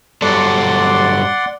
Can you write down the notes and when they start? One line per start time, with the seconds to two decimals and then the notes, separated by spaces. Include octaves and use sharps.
0.22 G2 F#3 A4 D5 F#5 C6